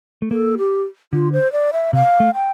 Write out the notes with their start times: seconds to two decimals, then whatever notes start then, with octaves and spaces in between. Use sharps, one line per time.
0.22 A3
0.31 A#3 A4
0.58 G4
1.13 D3 F4
1.32 C5
1.52 D5
1.73 E5
1.93 C3 F5
2.20 A3
2.34 G5